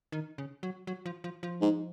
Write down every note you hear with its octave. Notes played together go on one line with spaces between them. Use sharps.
D#3
C#3
F#3
F#3
F3
F3
F3
G#2